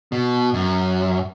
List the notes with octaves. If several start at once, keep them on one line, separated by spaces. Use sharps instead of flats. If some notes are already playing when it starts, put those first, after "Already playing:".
B2
F#2